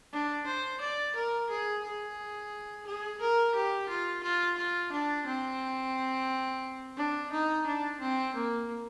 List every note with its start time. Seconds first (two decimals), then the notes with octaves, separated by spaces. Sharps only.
0.12 D4
0.47 C5
0.80 D5
1.15 A#4
1.50 G#4
1.84 G#4
2.87 G#4
3.21 A#4
3.55 G4
3.89 F4
4.23 F4
4.58 F4
4.92 D4
5.26 C4
6.97 D4
7.32 D#4
7.66 D4
8.00 C4
8.34 A#3